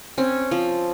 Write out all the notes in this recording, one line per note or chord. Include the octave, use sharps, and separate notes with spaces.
C4 C#4
F3